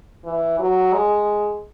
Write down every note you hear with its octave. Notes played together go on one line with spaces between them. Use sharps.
E3
F#3
G#3